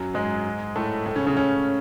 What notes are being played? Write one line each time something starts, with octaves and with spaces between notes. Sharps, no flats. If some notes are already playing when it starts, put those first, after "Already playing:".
Already playing: F#2 F#3
G#2 G#3
A2 A3
A2 A3
C#3 C#4
C#3 C#4
C#3 C#4